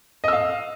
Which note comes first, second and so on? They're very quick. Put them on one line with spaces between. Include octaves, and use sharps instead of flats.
D#5 E6 F5